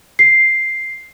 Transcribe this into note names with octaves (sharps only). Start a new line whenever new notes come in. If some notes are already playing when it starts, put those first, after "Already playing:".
C7